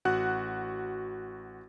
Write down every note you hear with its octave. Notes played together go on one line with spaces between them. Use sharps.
A1 F#4 F#5 F#6